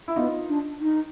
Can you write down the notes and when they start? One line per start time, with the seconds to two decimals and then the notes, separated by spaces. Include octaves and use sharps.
0.08 E4
0.16 B3 D#4 F4
0.49 D4
0.81 D#4